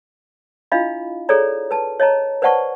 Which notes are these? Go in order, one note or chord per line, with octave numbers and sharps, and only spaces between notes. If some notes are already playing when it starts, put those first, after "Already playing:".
D4 E4 F4 D#5 F5 B5
G#4 A4 C#5 D5 A#5
B4 A5
C#5 D#5 A5 A#5
B4 C5 D5 F#5 A5 C#6